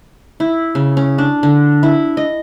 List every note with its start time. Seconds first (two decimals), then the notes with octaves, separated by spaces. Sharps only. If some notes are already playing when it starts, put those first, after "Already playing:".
0.40 E4
0.75 C#3
0.97 C#4
1.18 D4
1.43 D3
1.83 E4
2.17 D#5